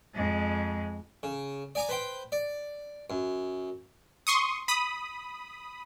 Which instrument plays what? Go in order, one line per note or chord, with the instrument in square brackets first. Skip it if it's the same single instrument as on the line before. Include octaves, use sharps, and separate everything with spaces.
[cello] F2 G#3
[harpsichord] C#3
D5 G#5 A#5 D6
B4 C5 G5
D5
F#2
[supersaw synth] C6 C#6 D#6
B5 D#6